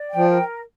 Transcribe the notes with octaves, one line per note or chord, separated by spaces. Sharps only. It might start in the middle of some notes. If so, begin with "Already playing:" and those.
Already playing: D5
G5
F3
A#4